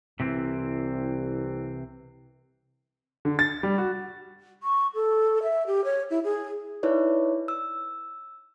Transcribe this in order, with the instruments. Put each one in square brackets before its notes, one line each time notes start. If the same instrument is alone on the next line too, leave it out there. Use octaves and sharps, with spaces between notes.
[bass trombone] C2 [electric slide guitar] C3 E3 C4
[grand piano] D3
A6
G3
F#4
[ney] C#6
A4
E5
G4
C#5
E4
G#4
[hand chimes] D#4 E4 B4 C#5 D5
E6